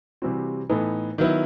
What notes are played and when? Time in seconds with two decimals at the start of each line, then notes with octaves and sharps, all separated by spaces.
0.22 C3 E3 G3 C4 F#4
0.70 A2 E3 B3 D#4 A4
1.18 D#3 F#3 B3 E4